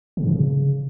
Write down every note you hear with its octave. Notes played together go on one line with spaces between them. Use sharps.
C#3
G#2
C#3